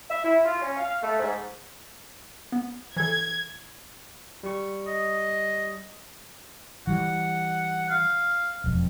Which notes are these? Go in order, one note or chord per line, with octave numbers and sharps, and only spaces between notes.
E5
E4
F4
C#4
F5
A3
G#2
B3
E3 A4 G#6
G3 C#6
D#5
E3 G3 F#5
F5
E1 F2